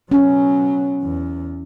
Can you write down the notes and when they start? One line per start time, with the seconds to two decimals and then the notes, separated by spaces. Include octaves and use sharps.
0.11 B2 F#3 C#4
1.02 E2